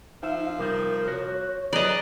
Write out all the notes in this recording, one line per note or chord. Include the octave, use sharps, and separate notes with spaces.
F3 D#4 E5 F5
C3 G3 D#4 A#4
F#4 C#5
F#3 G#4 B4 D5 D#5 A#5